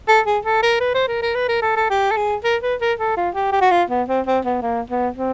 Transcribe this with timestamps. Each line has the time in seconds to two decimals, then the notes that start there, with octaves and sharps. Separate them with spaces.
0.08 A4
0.26 G#4
0.45 A4
0.63 A#4
0.80 B4
0.94 C5
1.08 A#4
1.22 A#4
1.35 B4
1.48 A#4
1.62 A4
1.76 A4
1.90 G4
2.11 A4
2.17 G#4
2.44 A#4
2.62 B4
2.81 A#4
2.99 A4
3.17 F4
3.35 G4
3.52 G4
3.61 F#4
3.71 F4
3.90 B3
4.08 C4
4.27 C4
4.45 B3
4.62 A#3
4.90 B3
5.16 C4